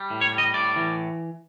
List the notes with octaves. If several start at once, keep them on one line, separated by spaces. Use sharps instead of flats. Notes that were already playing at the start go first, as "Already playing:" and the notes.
Already playing: G3
A2
C#5
G3
D#5
A2 D5
E3